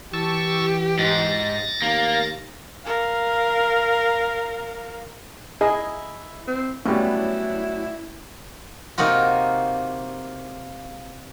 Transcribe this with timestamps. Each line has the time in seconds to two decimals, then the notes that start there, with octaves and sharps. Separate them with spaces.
0.14 E3 G4 A5 C#6 E6
0.98 G#2 A6 A#6
1.82 D#2 A#3
2.85 A#4 F5
5.61 E4 G#4 D#5
6.48 C4
6.86 A2 F#3 G3 B3 C#4 D4 E4
8.98 C3 A#3 D#4 F4 F#4